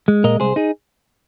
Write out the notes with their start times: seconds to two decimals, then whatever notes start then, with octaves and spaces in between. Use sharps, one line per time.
0.08 G#3
0.24 A#2 A#4 D#5
0.40 C2 G#4 C5
0.56 D#4 G#4